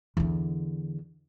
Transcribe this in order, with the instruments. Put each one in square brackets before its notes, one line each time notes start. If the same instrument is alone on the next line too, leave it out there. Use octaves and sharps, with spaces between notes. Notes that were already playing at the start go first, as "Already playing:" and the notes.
[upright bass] E2 D3